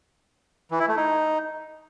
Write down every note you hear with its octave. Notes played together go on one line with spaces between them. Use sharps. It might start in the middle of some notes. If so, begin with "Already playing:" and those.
E3
E4
A3
D#4